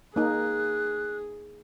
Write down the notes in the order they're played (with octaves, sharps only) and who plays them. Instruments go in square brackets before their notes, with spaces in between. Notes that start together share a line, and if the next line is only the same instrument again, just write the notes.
[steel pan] A#3 D#4 [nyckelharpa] G#4 [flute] F#6